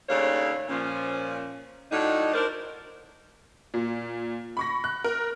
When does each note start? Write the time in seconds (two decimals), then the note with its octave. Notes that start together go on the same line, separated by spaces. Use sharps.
0.09 D#2 C#3 A3 D4 C#5 F5
0.69 A#2 F3 C#4
1.91 A2 F#3 D4 D#4
2.34 D4 A#4 C5
3.74 A#2
4.57 B5 C#6 A#6
4.84 F#6
5.04 A#4